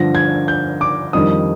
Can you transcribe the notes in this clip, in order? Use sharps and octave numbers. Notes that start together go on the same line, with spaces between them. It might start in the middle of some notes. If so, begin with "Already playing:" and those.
Already playing: G2 D3 F3 A#6
G#6
G6
D6
F2 D#3 G3 D4 D#6